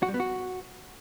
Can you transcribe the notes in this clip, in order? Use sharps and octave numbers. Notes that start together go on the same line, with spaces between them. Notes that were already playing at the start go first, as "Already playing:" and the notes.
F#4
G3
B3
F#4